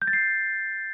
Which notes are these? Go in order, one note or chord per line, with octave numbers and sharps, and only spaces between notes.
G6
A6
C7